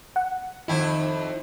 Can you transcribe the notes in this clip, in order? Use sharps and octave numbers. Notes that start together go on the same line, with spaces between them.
F#5
F2 D#3 D#4 E4